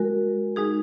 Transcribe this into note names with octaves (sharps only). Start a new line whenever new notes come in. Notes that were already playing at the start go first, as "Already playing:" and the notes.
Already playing: G#3 F#4 A#4
G#3 D#4 G#4